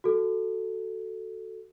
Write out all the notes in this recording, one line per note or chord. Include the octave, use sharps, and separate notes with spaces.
F#4 A4